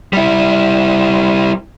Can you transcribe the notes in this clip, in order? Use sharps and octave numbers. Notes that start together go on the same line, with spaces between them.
G3 E4